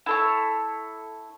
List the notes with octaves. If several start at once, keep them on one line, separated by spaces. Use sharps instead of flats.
E4 A4 C#5